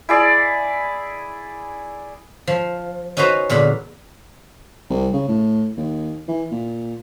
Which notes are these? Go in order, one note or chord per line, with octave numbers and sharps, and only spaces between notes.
E4 G#4 D5
F3
C#4 D#4 F#4 B4 C5
E2 A#2 D3 B5
C2
C#3
A2
D#2
E3
A#2